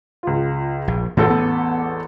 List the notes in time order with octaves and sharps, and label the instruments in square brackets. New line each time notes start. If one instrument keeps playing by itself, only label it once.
[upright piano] C#2 F4
[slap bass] A#1
[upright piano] A1 E2 A4 [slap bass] A2 F3
[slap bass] B3